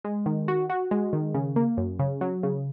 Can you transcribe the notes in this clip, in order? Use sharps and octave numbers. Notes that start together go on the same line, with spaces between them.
G#3
D#3
F#4
F#4
G#3
D#3
C#3
A#3
F#2
C#3
F#3
C#3